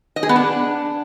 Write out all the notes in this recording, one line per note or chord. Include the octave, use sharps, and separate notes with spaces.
D#5
G#4
B3
D4